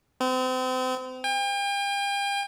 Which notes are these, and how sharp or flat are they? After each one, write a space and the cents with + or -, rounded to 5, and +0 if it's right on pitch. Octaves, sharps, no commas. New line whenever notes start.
C4 -35
G5 +40